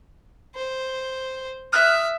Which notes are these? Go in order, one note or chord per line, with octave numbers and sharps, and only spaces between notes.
C5
E5 D#6 F6 F#6